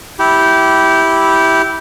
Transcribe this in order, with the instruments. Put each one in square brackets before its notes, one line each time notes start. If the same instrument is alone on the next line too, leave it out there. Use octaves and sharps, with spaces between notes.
[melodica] E4 G4